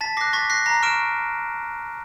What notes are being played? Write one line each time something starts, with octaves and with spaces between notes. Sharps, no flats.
A5 A6 B6
D6 F#6 A#6 C7
C#6 A6 B6
F#6 A#6 C7
A#5 A#6 C7
C#6 F6 D7 E7